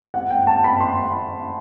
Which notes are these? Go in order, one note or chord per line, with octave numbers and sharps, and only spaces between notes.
F#5
G5
A5
B5
C6